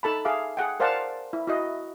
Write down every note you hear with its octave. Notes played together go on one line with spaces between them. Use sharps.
D#4 A4 A5 B5
G#4 E5 F5 D6
G#4 F#5 G5
A#4 C5 D5 F5 F#5 A5
E4
E4 F#4 D#5